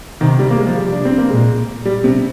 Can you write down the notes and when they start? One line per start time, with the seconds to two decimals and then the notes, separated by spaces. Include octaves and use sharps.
0.21 C3 D#3
0.39 G3
0.50 A#3
0.58 G#3
0.67 F3
0.76 C3 G3
0.92 D4
1.05 C4
1.18 A#3
1.30 A#2 G#3
1.85 G3
2.04 C3